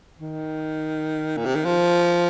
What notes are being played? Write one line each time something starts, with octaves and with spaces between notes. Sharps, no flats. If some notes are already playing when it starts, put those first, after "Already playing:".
D#3
A#2
C3
D#3
F3